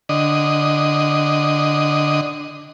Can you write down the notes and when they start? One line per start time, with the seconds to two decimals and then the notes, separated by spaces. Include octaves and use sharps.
0.09 D3 D#5